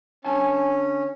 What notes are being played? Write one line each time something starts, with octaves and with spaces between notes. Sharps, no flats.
D3 C#4 G#5 A5